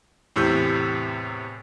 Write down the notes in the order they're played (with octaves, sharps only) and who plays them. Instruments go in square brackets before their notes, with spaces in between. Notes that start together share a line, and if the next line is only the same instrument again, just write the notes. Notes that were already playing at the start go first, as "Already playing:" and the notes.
[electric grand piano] E2 A2 C3 E6 G6